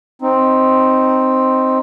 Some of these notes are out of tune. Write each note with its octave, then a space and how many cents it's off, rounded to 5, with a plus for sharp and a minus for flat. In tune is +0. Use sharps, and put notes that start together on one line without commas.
C4 +0 D#4 +0